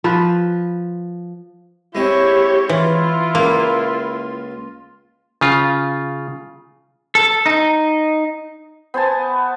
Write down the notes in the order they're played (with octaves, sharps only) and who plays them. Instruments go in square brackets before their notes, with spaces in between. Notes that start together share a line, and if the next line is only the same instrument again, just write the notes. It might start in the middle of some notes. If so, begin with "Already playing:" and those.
[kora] F3 B4
[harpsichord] G#3 C4 [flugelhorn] E4 [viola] G4 C#5
[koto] E3 [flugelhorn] E4 [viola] F4
[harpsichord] C#2 [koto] A#3
[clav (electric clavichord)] C#3 F4
[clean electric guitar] A4
D#4
[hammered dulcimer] B3 C5 G#5 A5